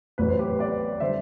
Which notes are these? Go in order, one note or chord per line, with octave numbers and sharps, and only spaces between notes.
A1 A2 F#3 B4
C5
G4 B4
B4 D5
D3 G3 C5 E5